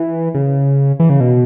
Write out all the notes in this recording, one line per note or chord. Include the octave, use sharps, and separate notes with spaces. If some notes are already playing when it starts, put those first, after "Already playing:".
Already playing: E3
C#3
E3
C#3
B2